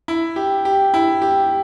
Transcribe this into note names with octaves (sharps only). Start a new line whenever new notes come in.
E4
G4
G4
E4
G4